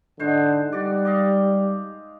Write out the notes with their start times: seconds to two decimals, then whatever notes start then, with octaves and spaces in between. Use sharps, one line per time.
0.19 G#2 D3 F#4 C5
0.73 G3 F#4 D5
1.05 D5 D#5 F5